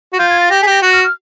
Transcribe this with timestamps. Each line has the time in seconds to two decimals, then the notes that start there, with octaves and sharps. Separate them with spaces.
0.13 F#4
0.19 F4 G6
0.30 G#6
0.40 A6
0.50 G4 A#6
0.61 G#4 B6
0.66 G4 A#6
0.82 F#4 F#6
0.93 F6
1.04 F6